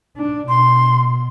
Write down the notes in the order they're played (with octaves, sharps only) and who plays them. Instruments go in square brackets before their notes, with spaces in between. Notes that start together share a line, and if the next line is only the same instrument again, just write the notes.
[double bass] D4
[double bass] B2 [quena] C6